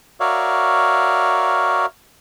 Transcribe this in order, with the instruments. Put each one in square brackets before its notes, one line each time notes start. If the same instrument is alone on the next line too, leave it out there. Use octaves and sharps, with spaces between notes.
[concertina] F#4 A#4 C#5 D5 E5 F5